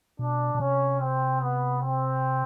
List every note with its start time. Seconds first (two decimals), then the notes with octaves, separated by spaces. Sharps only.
0.19 B2 D4
0.55 B2
0.60 C3 C#4
1.01 C4
1.41 B3
1.82 C4